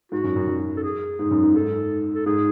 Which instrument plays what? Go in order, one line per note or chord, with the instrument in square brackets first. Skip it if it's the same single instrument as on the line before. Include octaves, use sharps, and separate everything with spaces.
[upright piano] G#2 [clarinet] F#4
[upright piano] F#2
F#2
F#2
[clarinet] A4
G#4
[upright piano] G#2
F#2
G#2
[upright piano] G#2 [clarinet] A4
[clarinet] A4
[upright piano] G#2 [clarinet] G#4